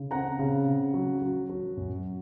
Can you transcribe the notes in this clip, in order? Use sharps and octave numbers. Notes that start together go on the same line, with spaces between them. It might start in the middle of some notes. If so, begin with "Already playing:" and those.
Already playing: C#3
C4 F#5 A#5
C#3
C#3
F#3
F#3
F#3
F#2